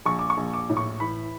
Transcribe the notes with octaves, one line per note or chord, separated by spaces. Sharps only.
A#1 C#6
D6
C#6
A#1
D6
A2
C#6
E3 B5